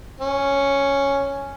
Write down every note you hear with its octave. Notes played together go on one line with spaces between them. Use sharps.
C#4